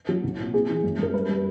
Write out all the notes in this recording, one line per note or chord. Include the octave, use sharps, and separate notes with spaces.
F#3
C2
A#2
C4 G#4
E3
F#2
F#2 A#4
G3 B4
G3